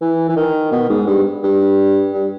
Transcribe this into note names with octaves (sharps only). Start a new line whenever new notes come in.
E3
E3
D#3
B2
G#2
G2
G2
G2